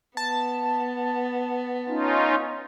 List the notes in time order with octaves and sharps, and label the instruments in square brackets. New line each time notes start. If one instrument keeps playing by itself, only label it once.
[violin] B3 [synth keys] A5
[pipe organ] C#4 D#4 F4